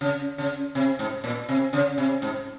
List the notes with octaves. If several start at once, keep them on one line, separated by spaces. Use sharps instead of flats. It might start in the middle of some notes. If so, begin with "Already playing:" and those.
C#3
C#3
C3
G#2
A#2
C3
C#3
C3
G#2